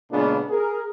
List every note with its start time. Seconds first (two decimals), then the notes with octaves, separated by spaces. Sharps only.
0.11 A#2 C#3 G#3 B3 D4
0.50 G#4 A#4